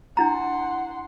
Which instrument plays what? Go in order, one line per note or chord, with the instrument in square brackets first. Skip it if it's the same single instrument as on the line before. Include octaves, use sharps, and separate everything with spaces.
[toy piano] D4 E4 A#5 [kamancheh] F#5 C6